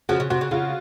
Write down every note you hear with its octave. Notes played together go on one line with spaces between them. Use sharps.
C#3 F3 F#4
C#3
C3 F#4
C#3
C#3 F4